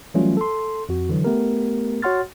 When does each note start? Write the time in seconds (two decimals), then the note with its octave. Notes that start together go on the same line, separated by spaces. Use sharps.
0.14 E3 F#3 G3 A3 C#4 F4
0.37 A4 C6
0.89 F2 F#4
1.09 D3 E3 F#3
1.24 A3 B3 G4 A#4
2.02 F#4 C#5 F#5 C6 F6 A6